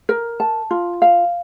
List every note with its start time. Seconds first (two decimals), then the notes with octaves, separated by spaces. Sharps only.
0.09 A#4
0.40 A5
0.71 F4
1.02 F5